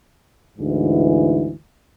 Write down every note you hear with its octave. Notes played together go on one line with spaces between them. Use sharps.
D2 G#2 E3